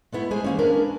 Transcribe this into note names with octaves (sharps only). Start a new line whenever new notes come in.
G#3 A3 B3 E4
G#3 G#4 C5 G#5
E3 A#3 C#4
C#4 D4 A#4 B4